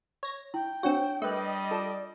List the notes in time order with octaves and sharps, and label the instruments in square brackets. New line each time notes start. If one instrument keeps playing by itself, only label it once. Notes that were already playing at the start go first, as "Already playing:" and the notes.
[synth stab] C#5 A#6
[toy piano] E4 [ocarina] G5
[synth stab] C4 F#4 [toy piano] D4 C#5 C#6
[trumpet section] G3 D#5 [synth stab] A3 B4 [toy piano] A#4
[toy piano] F4 [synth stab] A4 [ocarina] D5